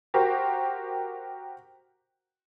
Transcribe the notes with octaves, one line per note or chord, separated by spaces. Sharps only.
F#4 G4 A#4 C5